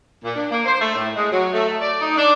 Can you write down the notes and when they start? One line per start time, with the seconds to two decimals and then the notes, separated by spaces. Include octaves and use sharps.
0.24 A#2
0.36 D4
0.51 A#3
0.65 C5
0.80 A3
0.95 A2
1.15 G#3
1.32 F#3
1.53 A3
1.81 D5
2.00 D#4
2.17 D4